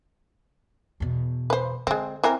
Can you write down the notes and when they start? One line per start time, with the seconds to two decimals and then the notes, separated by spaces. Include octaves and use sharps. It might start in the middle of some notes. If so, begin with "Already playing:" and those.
1.00 E2 B2
1.50 B4 C5
1.87 D3 G#3 C4
2.24 E3 C4 A#4